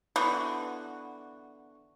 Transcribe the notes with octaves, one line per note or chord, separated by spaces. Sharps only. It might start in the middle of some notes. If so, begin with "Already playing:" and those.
D3 E3 B3 F#4